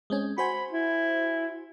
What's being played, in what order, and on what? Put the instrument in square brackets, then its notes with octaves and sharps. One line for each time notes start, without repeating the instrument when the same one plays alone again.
[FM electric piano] G#3 C4 C#4
[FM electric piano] F#4 C5 G#5 [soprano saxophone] B5
[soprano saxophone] E4